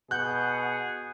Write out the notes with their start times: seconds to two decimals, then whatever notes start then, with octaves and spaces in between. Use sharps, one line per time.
0.11 B2 G#4 F#5 F#6 G6